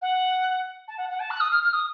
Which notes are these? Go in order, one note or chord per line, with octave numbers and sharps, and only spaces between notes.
F#5
A5
F#5
F#5
A5
F#6
D#6
F6
F6
D#6